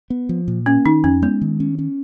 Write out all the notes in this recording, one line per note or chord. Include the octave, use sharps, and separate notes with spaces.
B3
F3
A#2
A#3 C#4
D#3 D#4
F2 C#4
G#3 B3
D#3
C#4
C#4